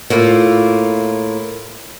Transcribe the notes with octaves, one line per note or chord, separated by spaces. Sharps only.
A2 A#3 E4 F4